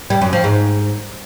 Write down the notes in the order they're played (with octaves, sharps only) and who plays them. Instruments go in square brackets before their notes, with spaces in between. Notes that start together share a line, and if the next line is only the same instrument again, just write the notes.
[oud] G3
F#2
F3
G#2